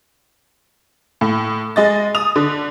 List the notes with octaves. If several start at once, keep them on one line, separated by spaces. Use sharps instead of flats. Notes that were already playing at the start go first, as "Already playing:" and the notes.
A2
G#3 D#5 A6
D#6 F7
D3